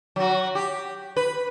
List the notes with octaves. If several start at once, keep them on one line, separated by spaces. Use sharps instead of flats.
F#3 F#4
G4
B4